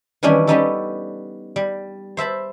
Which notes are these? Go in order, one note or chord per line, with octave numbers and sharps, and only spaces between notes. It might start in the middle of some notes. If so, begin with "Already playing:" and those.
D#3 E3 G3 C#4 D4
G3 B3 C#4 D#4 G4 A4
G3
C5 E5 A5 B5